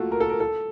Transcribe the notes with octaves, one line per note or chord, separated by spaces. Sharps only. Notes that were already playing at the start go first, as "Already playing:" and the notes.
Already playing: A3 A#3 F4 F#4 A4
A#4
A4
A#4
A4